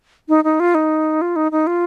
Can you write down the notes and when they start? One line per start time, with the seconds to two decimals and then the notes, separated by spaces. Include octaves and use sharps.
0.29 D#4
0.44 D#4
0.60 F4
0.75 D#4
1.21 F4
1.36 D#4
1.52 D#4
1.67 F4